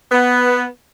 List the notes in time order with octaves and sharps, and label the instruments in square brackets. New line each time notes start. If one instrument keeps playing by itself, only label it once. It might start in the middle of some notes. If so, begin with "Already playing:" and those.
[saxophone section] B3